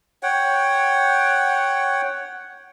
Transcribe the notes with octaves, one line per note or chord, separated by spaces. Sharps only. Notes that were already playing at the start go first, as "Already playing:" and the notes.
C#5 F#5 G5